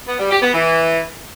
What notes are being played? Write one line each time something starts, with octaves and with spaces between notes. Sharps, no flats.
B3
G3
G4
B3
E3